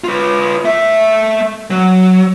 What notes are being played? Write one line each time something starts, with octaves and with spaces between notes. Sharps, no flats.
F4 B4
A3 E5
F#3